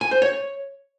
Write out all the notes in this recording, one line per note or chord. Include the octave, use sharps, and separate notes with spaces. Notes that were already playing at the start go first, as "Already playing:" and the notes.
G#5
C5
C#5